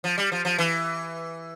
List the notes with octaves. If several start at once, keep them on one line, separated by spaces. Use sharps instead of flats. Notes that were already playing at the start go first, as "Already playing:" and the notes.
F3
G3
F3
F3
E3